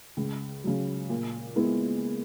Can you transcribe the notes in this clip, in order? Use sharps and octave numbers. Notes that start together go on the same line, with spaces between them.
C#2
C#3 F#3
A#2
G#3 B3 E4